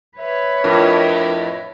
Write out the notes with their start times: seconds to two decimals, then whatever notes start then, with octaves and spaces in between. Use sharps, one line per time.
0.18 B4 C#5 E5
0.64 F2 A2 D4 F4 A#4